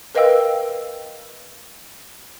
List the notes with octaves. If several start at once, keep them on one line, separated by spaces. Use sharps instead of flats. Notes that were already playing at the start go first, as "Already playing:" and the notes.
A#4 B4 D#5 F5 G5 E6